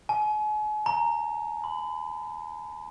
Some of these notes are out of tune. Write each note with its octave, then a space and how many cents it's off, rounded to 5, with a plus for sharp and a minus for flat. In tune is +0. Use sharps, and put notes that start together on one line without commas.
G#5 +40
A#5 -5
B5 +40